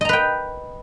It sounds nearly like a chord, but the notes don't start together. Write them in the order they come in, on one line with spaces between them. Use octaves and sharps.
D#5 A#5 B4 G5